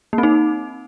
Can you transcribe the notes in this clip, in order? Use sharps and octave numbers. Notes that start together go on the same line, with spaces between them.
A#3
C4
D#4